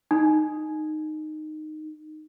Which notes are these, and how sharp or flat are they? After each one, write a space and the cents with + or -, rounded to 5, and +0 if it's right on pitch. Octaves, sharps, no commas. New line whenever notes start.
D#4 -15